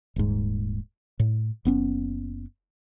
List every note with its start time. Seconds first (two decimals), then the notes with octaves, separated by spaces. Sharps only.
0.16 D#1 G#2
1.20 A2
1.65 F#1 B3 C#4